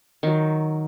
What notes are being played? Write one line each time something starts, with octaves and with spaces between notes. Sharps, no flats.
D#3 F#3